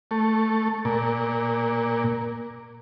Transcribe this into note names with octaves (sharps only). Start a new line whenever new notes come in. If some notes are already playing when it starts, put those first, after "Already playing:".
A3
A#2